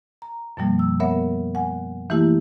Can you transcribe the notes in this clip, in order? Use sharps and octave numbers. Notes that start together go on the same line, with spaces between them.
A#5
F#2 B2 F3 G3 A#3
E6
B3 A#4 C#5 E5 F#5
F#5 G#5
E3 A3 A#3 E4 G4